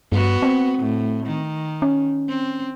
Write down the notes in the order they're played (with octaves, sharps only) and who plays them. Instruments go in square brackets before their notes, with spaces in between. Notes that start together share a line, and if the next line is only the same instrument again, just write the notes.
[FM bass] G2 [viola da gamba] B3 F#4
[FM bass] C4
[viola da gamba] A2
D#3
[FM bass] C#4
[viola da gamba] C4